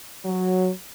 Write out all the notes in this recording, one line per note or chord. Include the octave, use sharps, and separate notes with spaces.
F#3